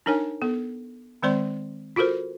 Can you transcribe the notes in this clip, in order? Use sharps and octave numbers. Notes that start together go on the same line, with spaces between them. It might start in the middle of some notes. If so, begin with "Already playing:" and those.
D4 D#4 A#4 C#5 G#5
B3 A4
D#3 G#3 C4 C5 D5 C6
F4 F#4 A4 A#4 C5